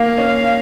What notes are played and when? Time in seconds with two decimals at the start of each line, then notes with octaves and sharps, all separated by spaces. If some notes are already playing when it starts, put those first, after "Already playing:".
Already playing: A#3 F5
0.18 C#4